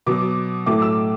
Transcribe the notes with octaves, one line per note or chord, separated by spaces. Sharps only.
B2 F#3 B3 D6
A2 F#3 A3 D6
E6